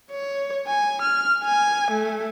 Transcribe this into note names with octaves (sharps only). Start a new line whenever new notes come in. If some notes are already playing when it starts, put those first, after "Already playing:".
C#5
G#5
F6
G#5
A3